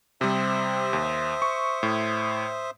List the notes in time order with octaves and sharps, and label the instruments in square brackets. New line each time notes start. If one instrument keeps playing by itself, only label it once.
[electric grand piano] C3 G3 [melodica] C5 E5 D#6
[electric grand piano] D#2
C#6
A2